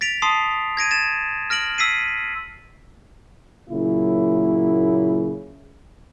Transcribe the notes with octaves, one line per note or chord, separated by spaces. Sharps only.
A6 B6 D7 F7
A5 C6 D#6 C7
G#6 A#6 D7 D#7
A6 E7
F6 A#6 D7 F#7
E6 B6 C7 D#7
A#2 C#3 F#3 A#3 E4